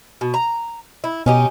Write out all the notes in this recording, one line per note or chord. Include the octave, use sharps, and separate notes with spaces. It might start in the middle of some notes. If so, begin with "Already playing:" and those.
B2
A#5
E4
B2 C#4 D#4 G4